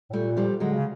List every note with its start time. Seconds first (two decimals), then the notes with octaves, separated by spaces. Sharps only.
0.10 A2
0.13 A#2 G3 A3
0.37 F3 G3
0.60 D3 F#3 G#3
0.73 C#3